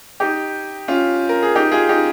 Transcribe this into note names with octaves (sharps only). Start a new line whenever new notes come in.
D#4 G4
C#4 F4
A#4
G#4
D#4 G4
F4 G#4
D#4 G4